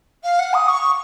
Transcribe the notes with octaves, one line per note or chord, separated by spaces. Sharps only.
F5
F#5
D#6
C#6